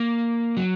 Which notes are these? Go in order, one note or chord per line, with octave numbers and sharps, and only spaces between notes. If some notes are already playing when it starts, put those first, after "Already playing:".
Already playing: A#3
F#3